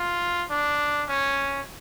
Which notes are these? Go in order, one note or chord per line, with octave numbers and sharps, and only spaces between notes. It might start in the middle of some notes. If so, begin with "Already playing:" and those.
Already playing: F4
D4
C#4